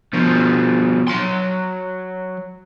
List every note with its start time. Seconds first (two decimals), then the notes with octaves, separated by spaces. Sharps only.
0.13 B2 F3
1.08 F#3 C6